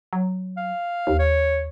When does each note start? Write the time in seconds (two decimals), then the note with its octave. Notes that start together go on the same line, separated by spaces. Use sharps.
0.13 F#3
0.57 F5
1.07 D#2
1.19 C#5